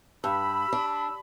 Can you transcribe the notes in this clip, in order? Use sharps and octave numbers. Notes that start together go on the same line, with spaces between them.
G2 B5 E6
D4